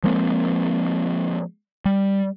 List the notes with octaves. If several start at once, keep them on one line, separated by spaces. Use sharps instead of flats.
F3 G#3 A#3 C4
G3